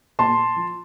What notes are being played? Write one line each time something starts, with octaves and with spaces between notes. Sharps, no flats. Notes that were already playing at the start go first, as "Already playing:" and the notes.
A#2 A5 C6
F3